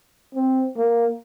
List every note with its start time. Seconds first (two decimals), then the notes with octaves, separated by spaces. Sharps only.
0.35 C4
0.77 A#3